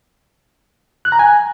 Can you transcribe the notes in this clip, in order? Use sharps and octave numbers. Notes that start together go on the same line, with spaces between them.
F#6
A#5
G#5